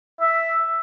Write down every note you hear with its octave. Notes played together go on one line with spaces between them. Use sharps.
E5